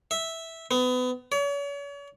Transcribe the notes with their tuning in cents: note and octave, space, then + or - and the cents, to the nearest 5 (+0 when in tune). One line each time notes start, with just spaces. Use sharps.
E5 -10
B3 +30
C#5 +40